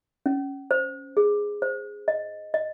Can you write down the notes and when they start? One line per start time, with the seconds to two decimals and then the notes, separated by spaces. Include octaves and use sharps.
0.26 C#4
0.71 C5
1.17 G#4
1.62 C5
2.08 D#5
2.54 D#5